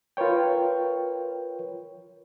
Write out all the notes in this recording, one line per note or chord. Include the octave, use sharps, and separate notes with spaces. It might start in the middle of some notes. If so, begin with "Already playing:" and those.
F4 A#4 B4 C#5 G5